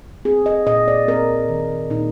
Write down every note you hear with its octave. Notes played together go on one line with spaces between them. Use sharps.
C4 G#4
D#5
A#2 D#5
D5
C4 A#4
D#3
A#2 D#4